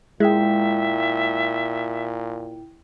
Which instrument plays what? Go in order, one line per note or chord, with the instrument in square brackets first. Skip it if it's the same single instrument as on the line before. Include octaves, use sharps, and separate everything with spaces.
[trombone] A#2 [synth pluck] G#3 [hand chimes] E4 G5 [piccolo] E5